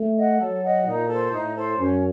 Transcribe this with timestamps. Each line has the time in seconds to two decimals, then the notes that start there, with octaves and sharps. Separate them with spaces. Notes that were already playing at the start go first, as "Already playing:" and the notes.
Already playing: A3
0.16 D#5 F#5
0.39 F#3 A4
0.62 D#5 F#5
0.85 A#2 D#4
1.08 A4 C5
1.32 A2 D#4
1.55 A4 C5
1.78 F#2 C#4